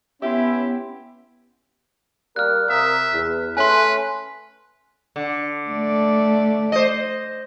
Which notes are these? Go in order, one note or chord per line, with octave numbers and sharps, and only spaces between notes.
B3 C#4 E4 G4 E5 C6
G3 A#3 A#4 F6 F#6
C3 A#4 E5 D#6
E2
A3 C#4 B4 G#5 C6
D3
A3 D5
C5 D#5